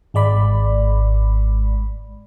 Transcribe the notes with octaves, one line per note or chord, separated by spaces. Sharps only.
G#1 G#3 D5 B5